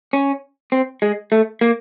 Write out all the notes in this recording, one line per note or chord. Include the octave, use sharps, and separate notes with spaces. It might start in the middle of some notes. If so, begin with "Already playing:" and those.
C#4
C4
G#3
A3
A#3